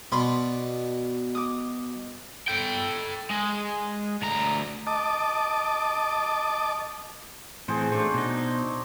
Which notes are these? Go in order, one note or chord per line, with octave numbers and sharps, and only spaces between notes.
B2 D5 B5 C6
D6 D#6
A4 G5
G#3
D2 A#5
D#5 A5 D6
A2 E3 C4 G#4 C5
F#3 A3 D4 C5
B2 D#4